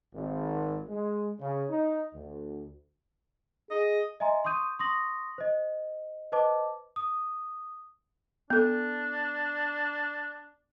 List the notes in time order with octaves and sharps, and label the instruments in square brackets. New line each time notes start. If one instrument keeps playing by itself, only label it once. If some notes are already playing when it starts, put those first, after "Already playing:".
[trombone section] G#1
G#3
C#3
D#4
D2
[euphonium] G#4 [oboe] D#5
[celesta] D#5 E5 G#5 A#5 C6
C6 C#6 D#6 G6 D#7
C6 C#6 D#6 A#6 F#7
C5 D#5
B4 C5 D#5 A5 D6
D#6
[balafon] B3 A4 [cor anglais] D4